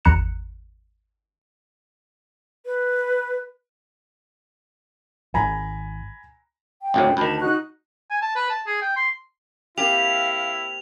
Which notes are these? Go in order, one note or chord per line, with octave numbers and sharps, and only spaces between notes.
G#1 E2 A#5 F#6 C#7 E7
B4
G#1 G#5 A#5 B5
G5
G#1 D2 A2
D2 D#3 A5 B5
D#4 F#4 F#6
G#5
A5
B4
A5
G#4
G5
C6
A#3 C4 E4 G4 F5 F7